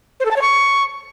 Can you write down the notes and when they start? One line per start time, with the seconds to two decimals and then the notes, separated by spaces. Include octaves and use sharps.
0.20 C5
0.25 A4
0.31 A5
0.36 C#5
0.42 C#6